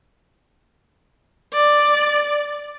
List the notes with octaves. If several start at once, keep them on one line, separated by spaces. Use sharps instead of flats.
D5